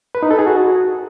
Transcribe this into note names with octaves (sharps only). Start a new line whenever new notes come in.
B4
D#4
A4
G#4
F#4